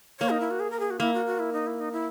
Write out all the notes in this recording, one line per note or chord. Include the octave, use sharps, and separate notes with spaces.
A#3 C#5
D#4
E4
F#4
G#4
A#4
G#4
F#4
A#3 E4
F#4
F#4
E4
D#4
E4
D#4
E4